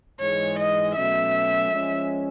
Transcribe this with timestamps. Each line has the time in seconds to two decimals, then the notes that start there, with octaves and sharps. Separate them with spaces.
0.20 G#2 E3 G#3 C#5
0.59 D#5
0.96 B2 F#3 A3 C#4 E5
1.71 F3 G#3 C#4